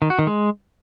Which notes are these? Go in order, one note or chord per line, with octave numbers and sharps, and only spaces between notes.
D#3
F#4
D#3
G#3